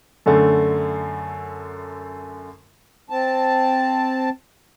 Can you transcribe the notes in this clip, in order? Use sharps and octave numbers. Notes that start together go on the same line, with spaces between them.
F#2 D3 A3
C4 A5